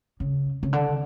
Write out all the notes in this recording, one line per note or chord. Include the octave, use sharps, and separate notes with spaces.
C#3
C#3
D3